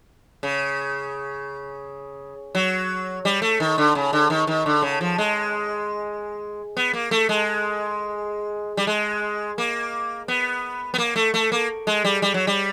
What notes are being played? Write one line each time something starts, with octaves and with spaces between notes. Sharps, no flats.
C#3
F#3
G3
A3
D#3
D3
C#3
D3
D#3
D#3
D3
C#3
F3
G#3
B3
A#3
A3
G#3
G3
G#3
A#3
B3
B3
A#3
A3
A3
A#3
G#3
G3
G3
F#3
G3